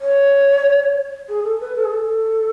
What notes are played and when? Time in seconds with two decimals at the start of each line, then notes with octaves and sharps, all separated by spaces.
0.01 C#5
1.29 G#4
1.44 A4
1.61 B4
1.76 A4
1.84 G#4
1.92 A4